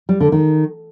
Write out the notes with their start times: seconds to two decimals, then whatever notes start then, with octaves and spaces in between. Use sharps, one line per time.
0.09 G3
0.20 D3
0.32 D#3